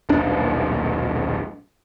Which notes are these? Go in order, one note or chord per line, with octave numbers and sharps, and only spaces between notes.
D#1 B1 D4